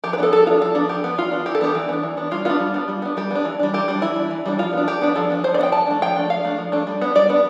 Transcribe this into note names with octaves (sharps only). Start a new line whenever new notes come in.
F3 G4
B4
B3 D4 A4
F3 A4
B3 D4 F4
F3 A4
B3 D4
F3 G4
B3 D4
E3 F4
B3 D4
E3 G4
A4
B3 D4 G4
E3
B3 D4
E3
B3 D4
G3 F4
B3 D4 F4
G3
B3 D4
G3
B3 D4
G3 G4
B3 D4
E3
G3 D4
E3 G4
G3 D4
E3 E4
G3 D4
E3
G3 D4
F3 F4
B3 D4
F3 G4
B3 D4
F3 A4
B3 D4
F3 C5
D5
B3 D4 G5
F3 A5
A3 D4
F3 G5
A3 D4
F3 F5
A3 D4
F3
A3 D4
G3
B3 D4
G3 D5
B3 D4